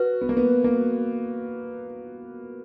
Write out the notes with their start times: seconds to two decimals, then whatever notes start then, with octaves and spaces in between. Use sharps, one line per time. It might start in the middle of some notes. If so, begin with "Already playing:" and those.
Already playing: F#4 B4
0.21 B3
0.29 A#3
0.37 B3
0.64 A#3